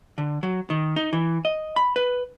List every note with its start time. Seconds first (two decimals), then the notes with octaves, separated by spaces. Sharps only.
0.18 D3
0.43 F#3
0.70 D#3
0.96 D#4
1.13 E3
1.45 D#5
1.76 B5
1.96 B4